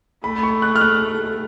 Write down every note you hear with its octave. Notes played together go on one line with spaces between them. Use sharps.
A3 B5
C#6
F#6
F6
F#6